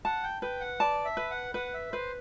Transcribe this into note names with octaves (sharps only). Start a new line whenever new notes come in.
F#5 A5
G5
B4 G5
F#5
D5 A5
E5
B4
F#5
B4 F#5
E5
B4 C5